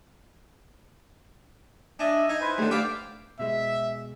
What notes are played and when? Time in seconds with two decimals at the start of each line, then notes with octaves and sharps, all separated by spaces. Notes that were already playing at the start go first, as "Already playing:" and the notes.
1.99 D4 D#5 E5 G#5
2.29 D#4 G#6
2.41 E4 B4 C5
2.58 D#2 D3 A3
2.71 D5 E5 F5 G5 D6 F6
3.39 B2 G#3 E5